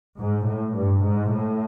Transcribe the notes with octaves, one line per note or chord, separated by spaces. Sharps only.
G#2
A2
G2
G#2
A2